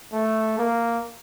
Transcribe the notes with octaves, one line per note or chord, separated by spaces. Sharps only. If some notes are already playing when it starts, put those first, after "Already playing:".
A3
A#3